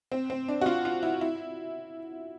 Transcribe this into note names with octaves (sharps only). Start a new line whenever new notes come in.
C4
C4
D4
F#4
F4
F4
E4
E4